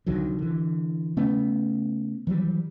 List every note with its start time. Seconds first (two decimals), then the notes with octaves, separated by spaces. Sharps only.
0.06 C2 D3 D#3 F#3
0.39 D3 E3
1.17 C#3 A3 B3 C#4
2.27 D#3 E3 F#3 G3